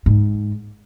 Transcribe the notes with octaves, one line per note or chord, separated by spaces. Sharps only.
G#2